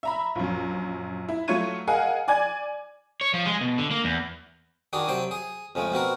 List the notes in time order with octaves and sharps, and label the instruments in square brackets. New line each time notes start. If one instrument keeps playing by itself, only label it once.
[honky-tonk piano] E5 A#5 B5
A#1 F#2
E4
F#3 A3 F4 C#6 G#6 D#7
G#4 A#4 D#5 F5 F#5 G#5
D5 G#5 G#6
[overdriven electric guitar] C#5
F3
G#3
B2
D3
A#3
E2
[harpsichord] D#3 D4 F#4 G#4
C3 F#3 G5 C6
G#4
F2 C#3 G#3 A3
B2 C4 F#4 A#4